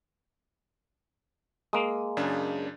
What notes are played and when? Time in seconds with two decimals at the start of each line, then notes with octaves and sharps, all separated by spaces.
1.73 G#3 A#3 D#6
2.17 F#2 C#3 D4